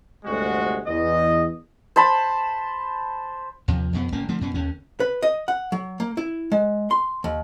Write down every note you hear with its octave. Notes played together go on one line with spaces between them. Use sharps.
G1 D2 C3 G#3 F#4
E2 D#5
C5 A5 B5
D#2 C3 F3
F2 B2 B3
G1 C#3 A#3 C#4
D3 F3 A3 C4
F#2 B2 C#4
D#2 D3 C#4
B4
D#5
F#5
F#3
A#3
E4
G#3
C6
D#2